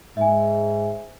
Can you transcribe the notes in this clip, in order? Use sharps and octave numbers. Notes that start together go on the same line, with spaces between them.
G#2 E5 G#5